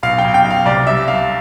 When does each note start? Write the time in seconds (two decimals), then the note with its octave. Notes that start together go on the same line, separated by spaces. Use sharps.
0.03 B1 F5
0.18 G5
0.24 B1
0.34 G5
0.44 B1
0.50 F5
0.66 C2 D5
0.86 G3 E5
1.08 G3 F5